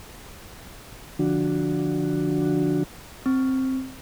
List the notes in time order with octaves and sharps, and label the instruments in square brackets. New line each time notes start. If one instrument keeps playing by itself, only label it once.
[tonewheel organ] D3 F3 D4 F#4
[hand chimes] C4